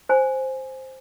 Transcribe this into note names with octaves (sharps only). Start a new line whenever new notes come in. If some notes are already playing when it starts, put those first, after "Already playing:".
C5 G#5